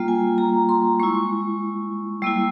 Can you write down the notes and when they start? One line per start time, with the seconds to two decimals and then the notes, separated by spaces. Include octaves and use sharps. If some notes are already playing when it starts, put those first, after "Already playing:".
Already playing: G3 A#3 F4
0.08 G#5
0.38 A#5
0.69 C6
1.00 G#3 E4 C#6
2.22 G3 A#3 E4 E6